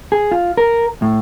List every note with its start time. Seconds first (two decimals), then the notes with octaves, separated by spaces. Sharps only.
0.12 G#4
0.31 F4
0.57 A#4
1.02 A2